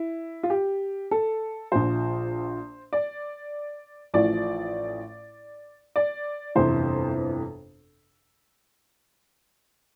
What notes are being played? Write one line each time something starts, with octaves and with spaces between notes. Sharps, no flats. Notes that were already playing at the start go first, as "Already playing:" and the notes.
Already playing: E4
F4
G4
A4
A#1 A#2 F3 C5
D5
A1 A2 F3 D5
D5
G1 F2 C3 E3 C5